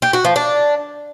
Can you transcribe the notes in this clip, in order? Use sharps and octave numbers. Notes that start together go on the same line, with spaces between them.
G4
F#4
F3
D4